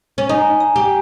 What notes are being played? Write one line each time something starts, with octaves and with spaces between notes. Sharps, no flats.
C#4
D#4 G#5
A#5
G4